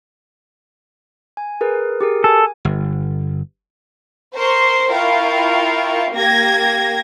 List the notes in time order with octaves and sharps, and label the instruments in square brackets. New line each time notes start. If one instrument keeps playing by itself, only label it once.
[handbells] G#5
G#4 A#4 B4
G4 G#4 A#4
[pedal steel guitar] A4 [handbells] G#5
[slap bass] G1
[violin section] A#4 C5 C6 C#6
E4 F4 A#4 F5 G5 C#6
A#3 G4 G#6 A#6